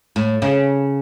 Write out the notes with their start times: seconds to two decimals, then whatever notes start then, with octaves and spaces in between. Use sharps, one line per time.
0.16 A2
0.42 C#3